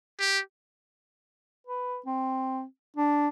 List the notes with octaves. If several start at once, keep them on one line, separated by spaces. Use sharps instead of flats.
G4
B4
C4
D4